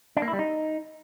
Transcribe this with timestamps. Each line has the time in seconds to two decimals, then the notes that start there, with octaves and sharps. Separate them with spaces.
0.17 D4
0.22 A#3
0.28 E4
0.33 G3
0.39 D#4